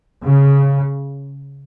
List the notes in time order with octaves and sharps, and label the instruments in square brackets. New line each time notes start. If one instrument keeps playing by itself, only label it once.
[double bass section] C#3